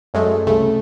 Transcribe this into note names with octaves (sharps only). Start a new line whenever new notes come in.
F#2 G#3 A3
C2 C#3 A3